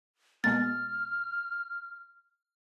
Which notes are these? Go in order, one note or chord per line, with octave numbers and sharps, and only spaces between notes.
B2 G#3 A#3 F6 A6